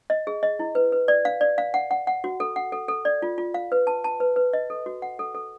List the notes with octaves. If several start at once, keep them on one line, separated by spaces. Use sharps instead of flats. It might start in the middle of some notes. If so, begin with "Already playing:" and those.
D#5
G#4
D#5
E4
B4
B4
D5
F5
D5
F5
F#5
F#5
F#5
F#4
A4
F#5
A4
A4
D5
F4
F4
F5
B4
A5
A5
B4
B4
D#5
A4
F#4
F#5
A4
A4